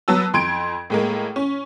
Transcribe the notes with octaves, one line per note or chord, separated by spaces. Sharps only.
F#3 B3 A5 E6
F2 C6 G#6 D7
A2 G#3 A#3
C#4